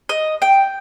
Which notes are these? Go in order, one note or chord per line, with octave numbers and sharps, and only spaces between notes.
D#5
G5